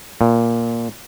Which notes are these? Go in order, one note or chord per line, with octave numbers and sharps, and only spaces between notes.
A#2